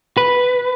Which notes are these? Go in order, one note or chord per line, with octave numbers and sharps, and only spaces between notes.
B4